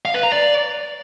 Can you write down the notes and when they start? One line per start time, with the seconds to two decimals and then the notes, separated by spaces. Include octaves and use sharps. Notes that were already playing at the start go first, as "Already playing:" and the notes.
0.05 F5
0.14 B4
0.23 A#5
0.32 D5